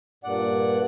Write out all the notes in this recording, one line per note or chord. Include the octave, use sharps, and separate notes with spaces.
G2 A#2 D5 F#5